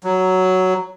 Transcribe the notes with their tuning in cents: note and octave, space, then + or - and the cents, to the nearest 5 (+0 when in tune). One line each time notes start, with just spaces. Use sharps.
F#3 +5